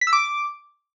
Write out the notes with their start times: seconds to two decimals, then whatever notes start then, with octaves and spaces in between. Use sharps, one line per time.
0.01 B6
0.07 E6
0.13 D6